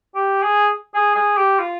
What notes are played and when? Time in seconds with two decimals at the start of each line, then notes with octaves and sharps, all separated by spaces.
0.14 G4
0.43 G#4
0.94 G#4
1.15 G#4
1.37 G4
1.59 F4